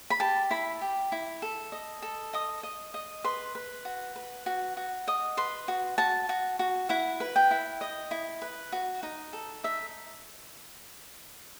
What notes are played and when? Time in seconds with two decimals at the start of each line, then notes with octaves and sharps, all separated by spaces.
0.10 B5
0.20 G4 A5
0.51 E4 B5
0.81 G4
1.12 E4
1.42 A4
1.72 D#5
2.02 A4
2.33 D#5 D#6
2.63 D#5
2.94 D#5
3.24 B4 C6
3.55 B4
3.85 F#4
4.16 B4
4.46 F#4
4.77 F#4
5.08 D#5 D#6
5.37 B4 C6
5.68 F#4
5.98 F#4 A5
6.29 F#4
6.59 F#4
6.89 E4 F#5
7.20 B4
7.36 G5
7.51 E4
7.81 D#5
8.11 E4
8.42 B4
8.72 F#4
9.03 D#4
9.33 A4
9.64 D#4 E5